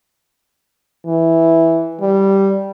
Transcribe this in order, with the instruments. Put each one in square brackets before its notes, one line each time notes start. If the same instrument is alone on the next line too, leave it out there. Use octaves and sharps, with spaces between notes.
[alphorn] E3
G3